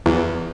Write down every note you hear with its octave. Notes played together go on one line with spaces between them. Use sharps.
E2